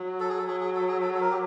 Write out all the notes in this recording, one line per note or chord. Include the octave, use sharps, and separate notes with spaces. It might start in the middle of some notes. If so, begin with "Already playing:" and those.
Already playing: F#3
A4
G#4
A4
F#3 G#4
G#4
A4
G#4
A4
A4
A#4
G4